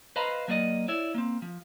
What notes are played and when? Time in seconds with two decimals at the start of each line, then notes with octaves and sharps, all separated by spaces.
0.16 B4 C5 D#5 F5 A#5 B5
0.48 F#3 A#3 B3 D5 D#5
0.88 E4 C#5 D5 E5
1.14 A#3 C4
1.42 F3